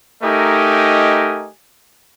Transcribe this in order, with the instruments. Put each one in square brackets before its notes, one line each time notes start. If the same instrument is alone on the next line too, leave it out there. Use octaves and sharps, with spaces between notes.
[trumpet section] A3 D#4 G4 A#4 D#5 G#5